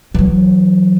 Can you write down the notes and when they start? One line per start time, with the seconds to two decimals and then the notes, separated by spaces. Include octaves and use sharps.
0.14 E3 F#3